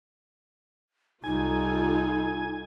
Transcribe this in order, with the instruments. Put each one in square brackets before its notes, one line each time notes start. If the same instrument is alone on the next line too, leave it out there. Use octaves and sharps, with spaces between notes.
[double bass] C2 G3 [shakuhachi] D#4 [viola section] F4 A4 [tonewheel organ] G#5